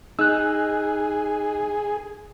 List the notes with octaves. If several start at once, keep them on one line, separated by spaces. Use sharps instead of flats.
D#4 G#4 E6 F#6